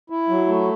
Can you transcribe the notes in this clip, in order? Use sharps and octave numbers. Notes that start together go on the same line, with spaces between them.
E4
F#3
A3